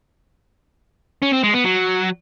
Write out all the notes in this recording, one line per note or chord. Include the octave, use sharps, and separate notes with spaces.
C#4
C4
G#3
B3
F#3